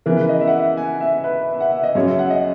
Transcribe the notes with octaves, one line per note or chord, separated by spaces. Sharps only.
C#3 E3 B3 A#4
B4
D#5
E5
F#5
E5
G#5
E5
B4
E5
F#5
E5
D#5
F#2 C#3 F#3 C#4 C#5
E5
F#5
D#5